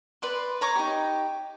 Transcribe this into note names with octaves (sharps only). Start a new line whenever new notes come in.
B4 D5 C6
C#5 A#5 C#6 D6
D#4 G4